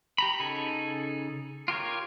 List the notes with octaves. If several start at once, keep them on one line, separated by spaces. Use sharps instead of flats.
G4 A#5 B5
C#3 D#4 A4 G#5
F4 G4 A#4 C#5